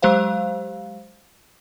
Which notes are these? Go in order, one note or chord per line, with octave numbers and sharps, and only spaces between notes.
F#3 G#3 G4 C5 F5